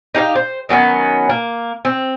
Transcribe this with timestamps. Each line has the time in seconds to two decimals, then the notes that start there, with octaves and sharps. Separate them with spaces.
0.15 D#4 G4 A#4 F5
0.35 C5
0.69 D#3 F#3 B3 C#4
1.29 A#3
1.85 C4